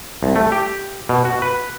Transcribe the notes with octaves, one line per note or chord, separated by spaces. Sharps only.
C2
A3
G4
B2
F#4
B4